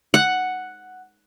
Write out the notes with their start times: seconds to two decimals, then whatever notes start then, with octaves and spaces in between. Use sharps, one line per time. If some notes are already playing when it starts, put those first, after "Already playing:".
0.14 F#5